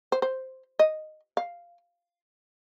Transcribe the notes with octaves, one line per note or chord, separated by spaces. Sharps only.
C5
C5
D#5
F5